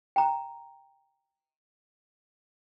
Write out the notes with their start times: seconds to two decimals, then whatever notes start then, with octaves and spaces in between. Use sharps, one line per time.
0.16 G5 A#5